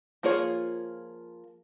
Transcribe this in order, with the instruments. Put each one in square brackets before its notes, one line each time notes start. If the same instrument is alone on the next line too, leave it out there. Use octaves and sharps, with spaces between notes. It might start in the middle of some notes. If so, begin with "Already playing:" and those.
[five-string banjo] F3 A#3 F4 G#4 C#5